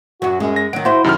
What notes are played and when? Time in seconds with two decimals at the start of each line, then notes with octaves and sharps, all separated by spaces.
0.22 F#2 F#3 F#4
0.40 F#2 G#3
0.56 A#6
0.73 D#3 F#3 D7
0.85 E4 F#4 C5
1.04 F#2 C3 D#3 F6